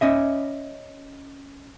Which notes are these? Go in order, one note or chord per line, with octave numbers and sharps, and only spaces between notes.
C#4 D#5 E5